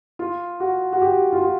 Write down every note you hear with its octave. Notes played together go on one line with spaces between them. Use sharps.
F4
F#4
F#4
G4
F4
F#4